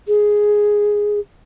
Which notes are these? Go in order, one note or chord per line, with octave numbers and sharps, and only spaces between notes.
G#4